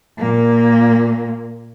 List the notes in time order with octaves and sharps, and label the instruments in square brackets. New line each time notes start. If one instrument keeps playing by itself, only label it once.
[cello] A#2 A#3